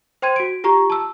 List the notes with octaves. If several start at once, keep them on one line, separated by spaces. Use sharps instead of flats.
C5 G5 C6 G#6 D#7
F#4 D7
F4 G4 A#5 C#6
A5 E6